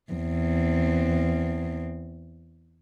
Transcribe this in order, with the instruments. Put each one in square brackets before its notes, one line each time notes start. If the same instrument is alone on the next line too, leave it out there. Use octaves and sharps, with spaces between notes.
[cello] E2 C4